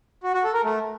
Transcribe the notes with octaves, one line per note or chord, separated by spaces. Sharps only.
F#4
F#4
A4
A#4
A3